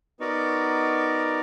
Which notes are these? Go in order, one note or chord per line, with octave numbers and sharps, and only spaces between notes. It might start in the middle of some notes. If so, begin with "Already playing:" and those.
B3 D#4 F#4 A#4 D5